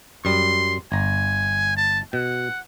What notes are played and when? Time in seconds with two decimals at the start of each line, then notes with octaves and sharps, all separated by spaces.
0.25 F#2 G3 C6
0.92 G1 G#5 A#5
1.77 A5
2.13 B2 F#5